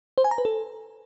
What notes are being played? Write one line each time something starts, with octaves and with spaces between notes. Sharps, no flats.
C5
G#5
A#5
B4
A4